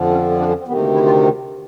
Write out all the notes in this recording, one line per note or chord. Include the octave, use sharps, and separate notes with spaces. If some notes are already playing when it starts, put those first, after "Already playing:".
Already playing: F2 D3 F3
C#4
C#4
D4
C#4
C4
D2 C3 D#3 B3
A#3
E4
F4